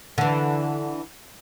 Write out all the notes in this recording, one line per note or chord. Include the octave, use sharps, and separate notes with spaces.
D3 E3